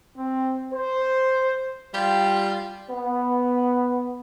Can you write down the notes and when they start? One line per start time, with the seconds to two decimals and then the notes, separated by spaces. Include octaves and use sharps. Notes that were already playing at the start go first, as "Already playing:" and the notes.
0.16 C4
0.72 C5
1.94 G3 F4 G4
2.90 B3